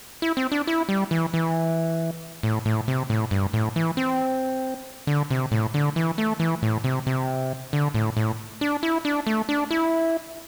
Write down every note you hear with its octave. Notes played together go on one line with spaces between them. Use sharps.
E4
C4
D4
E4
G3
E3
E3
A2
A2
C3
A2
G2
A2
E3
C4
D3
C3
A2
D3
E3
A3
E3
A2
C3
C3
D3
A2
A2
D4
E4
D4
A3
D4
E4